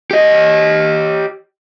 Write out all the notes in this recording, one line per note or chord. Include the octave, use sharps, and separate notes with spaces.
G4 D#5